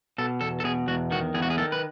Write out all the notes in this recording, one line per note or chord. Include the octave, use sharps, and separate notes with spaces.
B2 A4
E2 A4
A4
B2 G#4
E2 F#4
D#3 F#4
E2 G#4
F#4
G#4
D#3 A4
B4